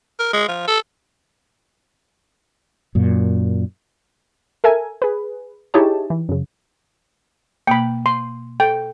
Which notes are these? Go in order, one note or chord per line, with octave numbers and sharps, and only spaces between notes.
A#4
G#3
F3
A4
F#2 A#2
A4 A#4 E5 G#5
G#4 B4
D#4 E4 G4 G#4 C#5 A5
E3
F#2 C#3
B2 A#3 G5 B5
C6
A4 G5